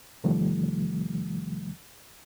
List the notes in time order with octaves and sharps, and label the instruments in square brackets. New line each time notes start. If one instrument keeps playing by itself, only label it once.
[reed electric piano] E2 C3 D#3 F3 G3 A3